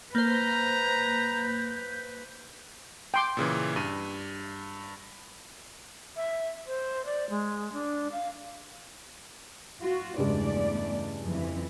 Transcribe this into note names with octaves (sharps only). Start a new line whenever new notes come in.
A#3 B4 C5 A#5 G6
G5 C6 D6
A#2 C#3 E3
G2 D#7
E5
C5
D5
G#3
D4
F5
F4 F#4
E2 G2 C#3 G#3 A3 D5
F2 E3